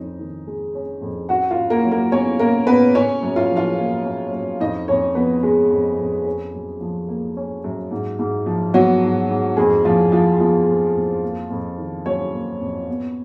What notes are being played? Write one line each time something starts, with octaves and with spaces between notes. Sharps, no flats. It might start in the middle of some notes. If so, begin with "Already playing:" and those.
Already playing: F2 C#4 D#4
D#3
G#3
C#4
F2
C#3 F#4 F#5
F4 F5
C#3
A#3 A#4
F#3
A#3 A#4
B3 C#4 C#5
C#3 A#3 A#4
C#3 B3 B4
C#4 C#5
F#2
F4 F5
F3
F4 F5
A#3
C#4
F#2
F2 D#4 D#5
F2 C#4 C#5
F3 B3 B4
G#3 G#4
F2
F2
C#4
F#2
F3
A#3
C#4
F#2
G#2
G#2
F3
F#3 B3 F#4
G#2
G#2
F2 G#3 G#4
F2 F3 F4
F3 F4
F3 B3 F4
F2
F2
A#3
F2
D#3
F#3 C#4 C#5
A#3
F2
B3